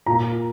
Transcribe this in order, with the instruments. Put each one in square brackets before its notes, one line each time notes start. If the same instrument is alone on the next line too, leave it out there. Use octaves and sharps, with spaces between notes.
[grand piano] A#2 A#5